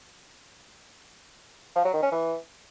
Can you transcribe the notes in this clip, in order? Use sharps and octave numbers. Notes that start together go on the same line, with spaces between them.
F3
F#3
D#3
C#4
E3